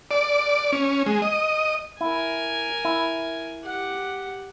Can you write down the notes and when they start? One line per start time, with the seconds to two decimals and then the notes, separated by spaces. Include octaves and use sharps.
0.11 D5
0.72 C#4
1.06 G#3
1.22 D#5
2.01 E4 A#4 G#5
2.85 E4
3.64 G4 F#5